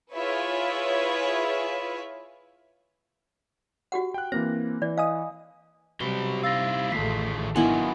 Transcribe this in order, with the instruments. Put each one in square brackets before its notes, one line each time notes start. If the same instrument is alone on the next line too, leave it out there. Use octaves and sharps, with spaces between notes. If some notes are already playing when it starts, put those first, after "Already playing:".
[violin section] E4 F4 G#4 B4 C#5 E5
[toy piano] F#4 G4 F#5
[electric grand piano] G5 F#6
[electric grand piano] E3 A#3 C4 [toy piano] C5 [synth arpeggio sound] A#6
[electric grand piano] E3 [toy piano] D5
[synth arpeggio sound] D#5 G#5 D#6 [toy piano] F5
[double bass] C3 G3 [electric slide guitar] F#3 F#4 B4 [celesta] G7
[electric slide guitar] D#4 E4 F5 [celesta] E6 A6 A#6
[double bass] A1 A3 [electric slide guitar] D#3 F4 G#4 [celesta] B6 C7
[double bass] D#3 [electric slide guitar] F#3 D4 F4 [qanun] B3 E4 [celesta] G#5